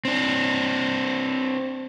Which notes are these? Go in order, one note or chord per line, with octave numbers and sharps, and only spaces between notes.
C4 D4